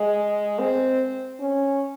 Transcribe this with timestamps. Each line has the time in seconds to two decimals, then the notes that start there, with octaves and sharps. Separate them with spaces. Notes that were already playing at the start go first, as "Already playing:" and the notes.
Already playing: G#3
0.59 C4
1.40 C#4